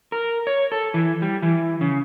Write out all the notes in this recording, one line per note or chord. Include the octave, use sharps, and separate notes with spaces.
A#4
C#5
A4
E3
G3
E3
C#3